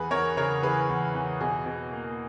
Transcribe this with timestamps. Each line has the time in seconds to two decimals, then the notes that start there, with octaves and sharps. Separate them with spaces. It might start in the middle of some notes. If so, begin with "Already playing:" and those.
Already playing: E2 G#4 B4
0.11 E2 A#4 C#5
0.37 C#3 A#4 C#5
0.62 E3 G#4 B4
0.89 E2
1.15 E2
1.41 B2 G#4
1.66 B2
1.92 A#3